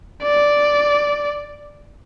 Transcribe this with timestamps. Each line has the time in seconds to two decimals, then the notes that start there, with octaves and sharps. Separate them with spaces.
0.23 D5